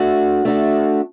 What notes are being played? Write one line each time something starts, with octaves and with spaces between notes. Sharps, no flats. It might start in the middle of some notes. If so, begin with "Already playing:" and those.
Already playing: A3 D4 F#4
A3 D4 F#4